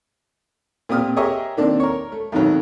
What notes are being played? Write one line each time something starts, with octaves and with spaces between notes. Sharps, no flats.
A#2 C4 G4 D#6 F6
G4 G#4 A#4 C#5 D#5 E5
C3 D#3 A#3 C4 D4
A#4 C#5
A3
F2 G#2 B2 D#3 F#3 B3